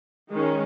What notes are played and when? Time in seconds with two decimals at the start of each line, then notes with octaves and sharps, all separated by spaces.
0.31 D#3 G#3 C#4